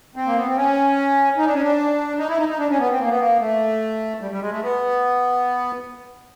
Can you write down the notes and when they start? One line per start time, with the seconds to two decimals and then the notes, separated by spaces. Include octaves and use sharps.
0.16 C4
0.26 A#3
0.36 B3
0.46 C4
0.56 C#4
1.37 D#4
1.46 D4
1.53 C#4
1.62 D4
2.19 D#4
2.29 E4
2.38 D#4
2.49 D#4
2.58 D4
2.69 C#4
2.79 B3
2.90 C4
3.00 A#3
3.10 B3
3.19 A#3
3.40 A3
4.21 G3
4.31 G3
4.41 G#3
4.51 A3
4.62 B3